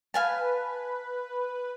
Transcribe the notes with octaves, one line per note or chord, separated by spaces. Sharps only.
B4 F5 G#5 A5